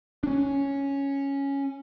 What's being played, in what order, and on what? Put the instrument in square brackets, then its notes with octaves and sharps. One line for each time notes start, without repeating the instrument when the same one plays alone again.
[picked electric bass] C#4 D4